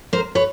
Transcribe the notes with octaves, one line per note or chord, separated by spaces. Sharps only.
A#4 C5
B4 C#5